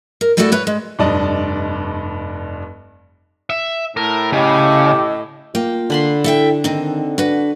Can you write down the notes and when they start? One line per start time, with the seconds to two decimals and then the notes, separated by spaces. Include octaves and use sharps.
0.21 A#4
0.37 G3 A3 E4 F#4 A4 D5
0.52 B4 C#5
0.67 G#3
0.99 F1 G2 D5 D#5 A5
3.50 E5
3.97 A2 A#4
4.33 C#3 G4 D#5
5.55 A#3 F4 G5
5.90 D3 B5 C6
6.24 E4 A4 E5 G5
6.64 D#3 C4 D#4
7.18 D4 F#4 B4